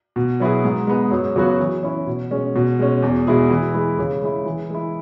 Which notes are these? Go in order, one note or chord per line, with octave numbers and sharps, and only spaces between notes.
B2
F#3 B3 E4 G#4
G#2
G#3 B3 G#4
F#2
C#3 F#3 B3 F#4
E3
C#4 E4
B2
G#3 C#4
B2
G#3 C#4
E2
B2 G#3 E4 G#4
E3
G#3 E4 G#4
C#3
G#3 E4
E3
G#3 E4